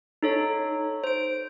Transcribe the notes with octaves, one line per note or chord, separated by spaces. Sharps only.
D#4 A4 C#5
C5 D7